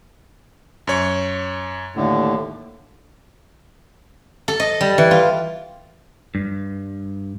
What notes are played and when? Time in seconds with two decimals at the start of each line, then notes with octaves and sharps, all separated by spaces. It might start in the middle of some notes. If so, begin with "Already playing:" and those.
0.87 F#2 C#5
1.96 D#2 A2 D3
4.48 A4
4.60 D#5
4.81 G3
4.98 E3
5.11 F4
6.35 G2